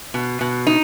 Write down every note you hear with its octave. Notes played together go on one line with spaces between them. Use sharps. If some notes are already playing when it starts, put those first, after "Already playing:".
B2
B2
D#4